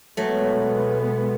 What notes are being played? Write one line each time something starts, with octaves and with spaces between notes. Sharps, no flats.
B2 F#3 G#3 A3 B3